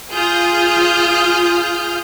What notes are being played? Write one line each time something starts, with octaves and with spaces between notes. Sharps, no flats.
F4 G#4 D#6 F6 G6